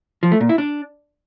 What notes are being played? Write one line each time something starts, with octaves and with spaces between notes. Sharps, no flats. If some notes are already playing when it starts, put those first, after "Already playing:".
F3
A3
A#2
E4
D4